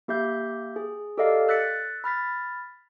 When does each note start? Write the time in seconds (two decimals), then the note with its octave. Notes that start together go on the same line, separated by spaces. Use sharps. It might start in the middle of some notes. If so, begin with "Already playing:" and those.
0.08 A#3 G4 E5 G6
0.76 G#4
1.17 G4 A4 A#4 D5 D#5 F5
1.48 E6 F#6 A6 B6 C#7
2.04 B5 F6 A6 B6